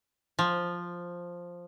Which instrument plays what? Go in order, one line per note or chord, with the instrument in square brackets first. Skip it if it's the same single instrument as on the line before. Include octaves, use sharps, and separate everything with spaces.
[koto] F3